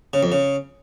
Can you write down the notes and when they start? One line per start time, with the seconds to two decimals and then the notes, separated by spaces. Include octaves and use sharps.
0.13 C#3
0.23 F2
0.32 C#3